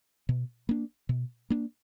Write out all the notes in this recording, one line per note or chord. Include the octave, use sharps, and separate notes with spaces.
B2
A#3 D4
B2
A#3 D4